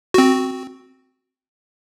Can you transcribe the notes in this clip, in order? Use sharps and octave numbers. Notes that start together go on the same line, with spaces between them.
C4 F#4